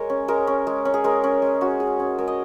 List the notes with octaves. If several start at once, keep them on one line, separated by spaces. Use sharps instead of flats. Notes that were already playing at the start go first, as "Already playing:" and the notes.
Already playing: G#3 A#4 C#5
C#4
G#3 A#4
C#4
G#3
C#4
G#4
G#3 A#4
C#4
G#3
C#4 F#4
G#3 G#4
C#4
G#3 A#4
D#5